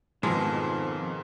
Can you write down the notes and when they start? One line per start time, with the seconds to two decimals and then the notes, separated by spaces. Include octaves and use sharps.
0.23 F2 G#2 B2 D#3 F3 G#3